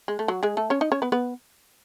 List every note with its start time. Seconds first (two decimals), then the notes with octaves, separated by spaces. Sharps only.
0.08 G#3
0.19 A3
0.28 F#3 F#4
0.43 G#3 G#4
0.57 A3 A4
0.70 C#4 C#5
0.81 D#4 D#5
0.92 C#4 C#5
1.02 B3 B4
1.12 B3 B4